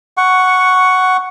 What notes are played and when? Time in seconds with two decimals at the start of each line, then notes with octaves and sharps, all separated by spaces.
0.17 F#5 C#6